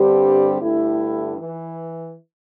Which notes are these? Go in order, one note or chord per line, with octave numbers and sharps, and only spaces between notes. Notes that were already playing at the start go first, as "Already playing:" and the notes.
Already playing: G2 D3 G3 C4 G4
G2 D3 A3 E4 G4
E3